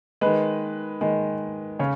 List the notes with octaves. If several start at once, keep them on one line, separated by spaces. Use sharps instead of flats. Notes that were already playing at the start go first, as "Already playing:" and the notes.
D#3 G#3 B4
D#3 G#3
C#3 C#4 C#5